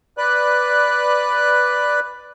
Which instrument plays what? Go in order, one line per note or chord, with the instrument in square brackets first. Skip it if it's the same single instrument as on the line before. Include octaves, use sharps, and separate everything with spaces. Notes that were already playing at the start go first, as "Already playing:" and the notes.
[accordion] B4 D5 F#6